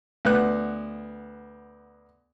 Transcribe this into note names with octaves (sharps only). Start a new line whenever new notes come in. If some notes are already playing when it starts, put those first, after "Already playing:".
D2 B3 F#6